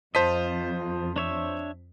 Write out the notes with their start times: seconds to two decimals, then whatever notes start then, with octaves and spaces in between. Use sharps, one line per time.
0.15 F2 F4 C5 D#5 A5 B6
1.16 D4 C#5 E5